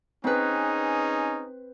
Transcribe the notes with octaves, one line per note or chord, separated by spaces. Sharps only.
C4 C#4 D#4 G#4 B4